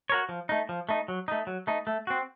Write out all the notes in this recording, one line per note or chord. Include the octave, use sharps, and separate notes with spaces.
F#4 A#4 C#5
F3
A3 D#4
F3
A3 D#4
F#3
A3 D#4
F#3
A3 D#4
A3
C4 F#4